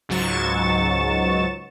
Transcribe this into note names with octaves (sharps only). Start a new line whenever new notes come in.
C#2 G#2 F#3 C#6 A6 E7